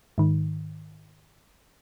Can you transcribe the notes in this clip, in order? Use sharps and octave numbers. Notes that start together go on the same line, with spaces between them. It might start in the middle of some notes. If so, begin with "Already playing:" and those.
G#2 D#3